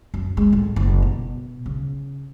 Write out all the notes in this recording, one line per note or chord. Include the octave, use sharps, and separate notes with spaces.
F#2
G#3
A2
F#1
B2
C#3